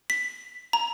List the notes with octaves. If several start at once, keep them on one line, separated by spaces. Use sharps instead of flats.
B6
A#5